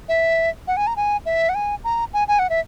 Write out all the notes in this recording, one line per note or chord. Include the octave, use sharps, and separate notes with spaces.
E5
F#5
G#5
A#5
G#5
E5
F#5
G#5
A#5
G#5
G#5
F#5
E5